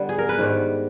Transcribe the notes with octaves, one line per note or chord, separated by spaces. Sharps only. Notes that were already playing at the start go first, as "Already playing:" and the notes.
Already playing: D3 G3 B3
G#4
A#4
B4
G#2 D#3 G3